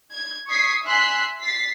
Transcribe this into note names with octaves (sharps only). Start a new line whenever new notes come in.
G#6
C#6 D#6 G#6 B6 C7
E5 G#5 C6 F#6 B6 C7
A6 B6 C7